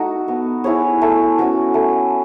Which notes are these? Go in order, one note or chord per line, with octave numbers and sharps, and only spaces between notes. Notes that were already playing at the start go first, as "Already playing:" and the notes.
Already playing: A3 D#4 F#4
B3
E4 G#4 C#5
A3
C#4 F#4 B4
A3